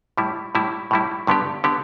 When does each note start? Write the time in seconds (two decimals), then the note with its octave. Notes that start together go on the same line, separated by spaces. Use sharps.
0.18 A2 G3 E4
0.55 A2 G3 E4
0.91 A2 G3 E4
1.27 G2 D3 B3 G4
1.64 D3 B3 G4